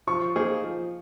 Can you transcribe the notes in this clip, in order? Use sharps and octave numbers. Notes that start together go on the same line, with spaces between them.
F3 C#6
A#3 D#4 G#4 C5
F3